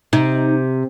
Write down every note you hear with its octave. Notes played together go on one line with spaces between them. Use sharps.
C3 D#4